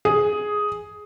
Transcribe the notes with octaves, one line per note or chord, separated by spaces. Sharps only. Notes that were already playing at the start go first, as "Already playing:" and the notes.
G#4